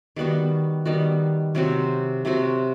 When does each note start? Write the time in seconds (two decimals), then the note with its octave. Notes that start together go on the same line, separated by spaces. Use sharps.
0.16 D#3 G3 B3 F#4
0.85 D#3 G3 B3 F#4
1.55 C3 F#3 C4 F#4
2.25 C3 F#3 C4 F#4